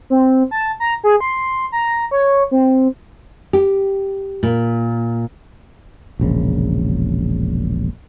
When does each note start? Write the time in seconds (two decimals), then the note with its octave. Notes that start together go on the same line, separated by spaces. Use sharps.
0.10 C4
0.51 A5
0.80 A#5
1.04 G#4
1.21 C6
1.72 A#5
2.11 C#5
2.51 C4
3.53 G4
4.43 A#2
6.19 E1 A#1 C#3